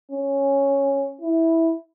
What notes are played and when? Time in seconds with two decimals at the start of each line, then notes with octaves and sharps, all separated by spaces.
0.11 C#4
1.21 E4